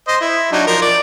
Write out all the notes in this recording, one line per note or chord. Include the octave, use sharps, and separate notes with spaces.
C5 D#5
E4
F#3 D4 D#4
F3 A#4
D5